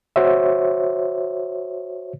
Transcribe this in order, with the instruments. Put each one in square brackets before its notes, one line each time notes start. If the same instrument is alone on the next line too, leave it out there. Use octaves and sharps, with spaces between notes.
[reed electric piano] F#4 C5 C#5 E5